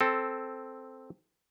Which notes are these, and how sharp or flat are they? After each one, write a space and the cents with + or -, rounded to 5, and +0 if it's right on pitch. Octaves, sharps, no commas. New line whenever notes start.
C4 +0 A4 +0